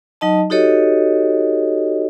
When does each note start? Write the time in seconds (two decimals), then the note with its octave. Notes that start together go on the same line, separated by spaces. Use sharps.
0.21 F#3 D#4 D#5 A5
0.50 D#4 F#4 G4 A4 C#5 D#5